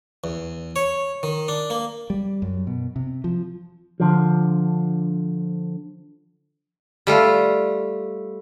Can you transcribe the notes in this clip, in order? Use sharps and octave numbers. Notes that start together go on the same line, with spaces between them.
E2
C#5
D#3
D4
A#3
G3
F#2
B2
C3
F3
D3 F3
G3 A3 F4